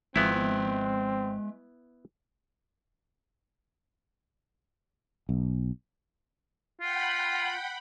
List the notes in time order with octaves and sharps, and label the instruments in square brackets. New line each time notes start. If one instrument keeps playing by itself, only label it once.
[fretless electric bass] G#1 F3 [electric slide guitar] G#3 E5 [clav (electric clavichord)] B3 E4 [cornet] C4
[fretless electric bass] B1
[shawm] F4 [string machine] F#5 G5 B5